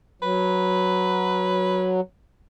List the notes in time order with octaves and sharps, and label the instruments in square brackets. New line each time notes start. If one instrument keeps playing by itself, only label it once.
[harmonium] F#3 [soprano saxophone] B4